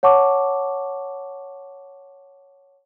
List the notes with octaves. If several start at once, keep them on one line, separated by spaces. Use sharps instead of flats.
C#5 F#5 A5 C#6 D6